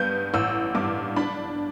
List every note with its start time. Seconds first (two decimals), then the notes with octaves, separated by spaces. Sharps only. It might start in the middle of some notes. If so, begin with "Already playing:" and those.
Already playing: G2 B3 G6
0.34 A1 E6
0.75 G2 D6
1.16 D4 B5